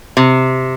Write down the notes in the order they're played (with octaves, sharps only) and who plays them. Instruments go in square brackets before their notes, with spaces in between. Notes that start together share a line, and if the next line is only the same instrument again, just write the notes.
[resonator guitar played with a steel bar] C3